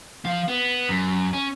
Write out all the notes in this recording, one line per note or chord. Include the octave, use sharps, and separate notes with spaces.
F3 F5
B3
F#2
C#4